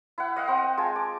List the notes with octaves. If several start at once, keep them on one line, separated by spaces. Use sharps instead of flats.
E4 F#5
D#5 F5 F#5
C4 F#5
G5
G#3 F4 G#5 A5
D6